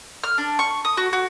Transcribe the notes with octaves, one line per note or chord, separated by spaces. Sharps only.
F6
D4
C#6
D#6
F#4
F#4